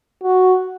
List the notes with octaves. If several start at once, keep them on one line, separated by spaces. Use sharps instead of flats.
F#4